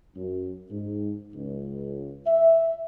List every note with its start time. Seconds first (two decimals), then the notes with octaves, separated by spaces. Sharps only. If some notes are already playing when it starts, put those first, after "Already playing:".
0.16 F#2
0.71 G#2
1.35 C#2
2.26 E5